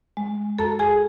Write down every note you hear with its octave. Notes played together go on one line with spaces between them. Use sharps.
G#3
F#2 A4 A5
G#4 G#5